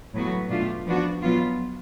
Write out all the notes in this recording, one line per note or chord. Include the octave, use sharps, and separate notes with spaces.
A2 F#3 B3 F#4
B2 A3 D4 F4
F3 B3 D4 F#4
B2 F#3 B3 F4